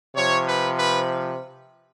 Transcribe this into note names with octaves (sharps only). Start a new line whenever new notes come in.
C3 F3 C#5
B4
B4